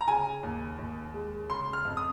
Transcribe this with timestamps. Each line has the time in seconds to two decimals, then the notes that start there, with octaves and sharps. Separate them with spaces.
0.01 A#5
0.08 C#3 G#5
0.43 D#2
0.78 D#2
1.14 G#3
1.50 C#3 C6
1.73 F6
1.85 F2
1.97 D#6